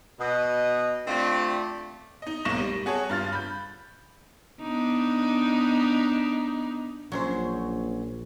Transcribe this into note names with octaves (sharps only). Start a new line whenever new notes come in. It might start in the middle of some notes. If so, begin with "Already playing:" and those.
B2 D#5
A3 C4 D4 F4 G4 D5
D#4 D#5
B1 G#2 A#3 C#6 A#6 E7
G3
F#4 G#4 A4 C#5
G2 F4 F6 A6
B5 G6
B3 D4 D#4
A#1 F#3 C#4 C5